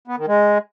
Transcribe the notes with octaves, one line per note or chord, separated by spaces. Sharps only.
B3
D#3
G#3